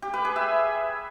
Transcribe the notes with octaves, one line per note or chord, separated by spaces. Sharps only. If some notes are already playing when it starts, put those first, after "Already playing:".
G4
B4
G#4
E5